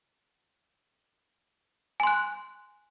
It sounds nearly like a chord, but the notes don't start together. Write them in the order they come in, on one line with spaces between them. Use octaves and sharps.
G#5 C6 F#6